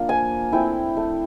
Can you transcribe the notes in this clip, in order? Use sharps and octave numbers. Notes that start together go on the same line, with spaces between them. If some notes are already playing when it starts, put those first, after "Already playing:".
Already playing: A#3 D4 F4
F3 G#5
A3 C4 E4 G5
A3